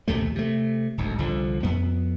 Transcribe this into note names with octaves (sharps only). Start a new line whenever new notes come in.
A#1 D#2 C3 A3
C3 A3
D1 G#1 D2
C2 D3 F3
F2 B3